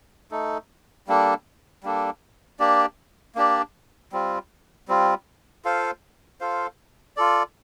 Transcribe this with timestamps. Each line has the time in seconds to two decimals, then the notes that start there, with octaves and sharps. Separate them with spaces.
0.31 A3 D#4 A4
1.07 G3 A#3 D4 A4
1.83 G3 A#3 D4 A4
2.59 A#3 D4 G4 D5
3.35 A#3 D4 G4 D5
4.12 G3 C4 F4
4.88 G3 C4 F4
5.65 F4 A4 C5 F5
6.41 F4 A4 C5 F5
7.17 F4 A4 D5